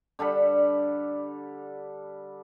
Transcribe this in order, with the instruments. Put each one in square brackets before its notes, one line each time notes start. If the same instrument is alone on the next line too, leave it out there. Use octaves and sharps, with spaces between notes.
[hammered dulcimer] D3 G3 A4 B5